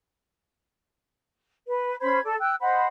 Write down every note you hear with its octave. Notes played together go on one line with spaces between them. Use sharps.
B4
C#4 C5 B5 G#6
A4 D5
G5 E6 F#6
C5 D#5 F#5 B5